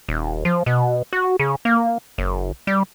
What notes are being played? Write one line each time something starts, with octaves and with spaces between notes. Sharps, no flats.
D#1
F3
B2
F#4
C#3
A#3
F#1
G3